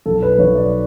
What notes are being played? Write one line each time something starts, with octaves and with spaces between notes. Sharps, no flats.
B1 A4
B4
B1 C#5
D5